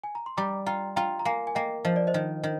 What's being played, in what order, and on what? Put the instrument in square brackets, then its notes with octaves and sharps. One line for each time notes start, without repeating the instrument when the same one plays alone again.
[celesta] G#5
A#5
C6
[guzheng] G3 [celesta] A#5 D6
[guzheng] F4 [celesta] G5 A#5
[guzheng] F4 [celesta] G5 A#5
[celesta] A#5
[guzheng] A#3 [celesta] F5 G#5
[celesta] G#5
[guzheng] A#3 [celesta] D#5 G5
[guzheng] F3 [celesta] D#5
[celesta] D5
C5 D#5
[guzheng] D#3
D#3